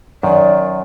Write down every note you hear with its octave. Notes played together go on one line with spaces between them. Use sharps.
F#2 D#3 D5